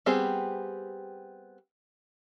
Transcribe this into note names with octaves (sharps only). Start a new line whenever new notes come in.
G3 B3 C4 G4 G#4